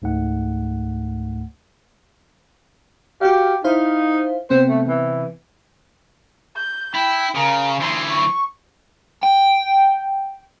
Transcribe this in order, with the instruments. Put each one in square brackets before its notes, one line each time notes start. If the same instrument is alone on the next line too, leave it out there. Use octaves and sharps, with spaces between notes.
[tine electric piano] C#2 G#2 A3 F#5
[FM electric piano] F#4 F5 [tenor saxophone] G4
[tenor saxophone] D#4 [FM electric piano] E4 C5 F5
[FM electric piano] C3 B3 C4 [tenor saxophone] C5
[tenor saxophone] A3
E3
[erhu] G6
[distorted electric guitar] E4 [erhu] G5
[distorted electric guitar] C#3 [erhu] A#4
[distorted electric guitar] D2 E3 [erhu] C6
[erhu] C#6
[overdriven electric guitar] G5